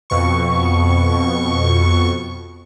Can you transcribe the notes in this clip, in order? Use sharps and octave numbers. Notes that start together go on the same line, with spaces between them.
F2 B2 C#6